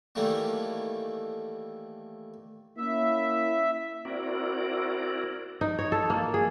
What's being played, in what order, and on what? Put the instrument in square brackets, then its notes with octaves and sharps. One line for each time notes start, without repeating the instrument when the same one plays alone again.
[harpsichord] D#3 E3 G3 A3 A#3
[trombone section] A#3 C#4 E4 [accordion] E5
[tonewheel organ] C4 E4 F#4 A#4 D5
[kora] D#4
C#5
A4
A#3
G#4